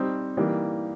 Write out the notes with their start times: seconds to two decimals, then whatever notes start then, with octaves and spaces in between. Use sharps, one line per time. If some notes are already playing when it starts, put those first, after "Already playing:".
Already playing: G3 C4 D#4
0.37 E3 G3 A#3 D#4